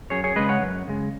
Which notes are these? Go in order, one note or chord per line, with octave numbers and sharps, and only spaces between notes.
F#2 G#4 C#5
G#4 C#5
C#3 G#3 B4 D#5
C#5 F#5
F#2
C#3 G#3